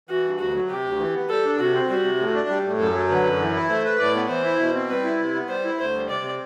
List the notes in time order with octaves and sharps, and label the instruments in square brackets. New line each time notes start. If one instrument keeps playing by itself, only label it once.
[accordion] E3 [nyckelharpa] F#4
[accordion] G2
[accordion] D2 [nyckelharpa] F#4
[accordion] F#3
[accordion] C3 [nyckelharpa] G4
[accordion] D2
E3
B3
[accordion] G3 [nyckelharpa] A4
[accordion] D4
[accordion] C3 [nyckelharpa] F#4
[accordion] C4
[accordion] G3 [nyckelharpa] F#4
[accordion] C3
A2
D4
[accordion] G3 [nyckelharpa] G4
[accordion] A2
[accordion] F#2 [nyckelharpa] A4
[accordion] F#3
[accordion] D3 [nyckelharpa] B4
[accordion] F#2
E3
E4
[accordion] A3 [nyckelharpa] C5
[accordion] B4
[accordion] A2 [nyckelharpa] D5
[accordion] B3
[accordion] E3 [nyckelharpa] C5
[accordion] E4
B2
C4
[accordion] G3 [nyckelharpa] B4
[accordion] E4
C3
B3
[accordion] G3 [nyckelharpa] C5
[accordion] E4
[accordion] D2 [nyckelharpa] C5
[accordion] G3
[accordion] C3 [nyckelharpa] D5
[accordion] C4